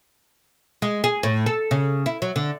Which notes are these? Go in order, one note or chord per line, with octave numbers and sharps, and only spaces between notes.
G#3
G#4
A2
A4
C#3
E4
F#3
D3